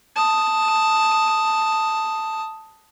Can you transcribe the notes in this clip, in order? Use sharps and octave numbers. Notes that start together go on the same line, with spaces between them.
A5 D#6